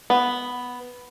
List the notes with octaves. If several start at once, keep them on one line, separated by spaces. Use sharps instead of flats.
B3